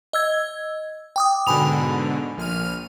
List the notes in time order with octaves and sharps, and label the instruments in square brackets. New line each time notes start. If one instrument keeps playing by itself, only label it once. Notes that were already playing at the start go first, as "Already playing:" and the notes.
[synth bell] D#5 E6 G#6
G5 D6 D#6
[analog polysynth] G#2 B2 D3 [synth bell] G#5 B5 F7
[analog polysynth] A#1 F6 D#7